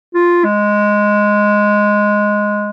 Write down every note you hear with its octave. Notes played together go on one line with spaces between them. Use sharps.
F4
G#3